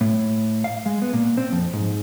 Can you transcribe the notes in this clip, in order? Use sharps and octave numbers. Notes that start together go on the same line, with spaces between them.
A2
F5
G#3
B3
A#2
C4
F2
G#2